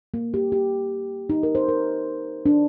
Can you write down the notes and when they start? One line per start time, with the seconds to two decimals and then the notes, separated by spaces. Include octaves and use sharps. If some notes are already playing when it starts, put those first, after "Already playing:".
0.14 A#3
0.34 G4
0.52 G4
1.30 D#4
1.43 A#4
1.55 C5
1.69 A#4
2.46 D4